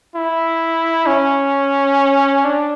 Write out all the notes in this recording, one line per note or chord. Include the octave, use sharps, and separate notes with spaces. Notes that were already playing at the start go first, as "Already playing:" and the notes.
E4
C#4
D4